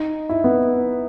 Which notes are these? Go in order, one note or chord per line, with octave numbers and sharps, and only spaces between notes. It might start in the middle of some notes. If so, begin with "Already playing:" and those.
Already playing: D#4
E4
B3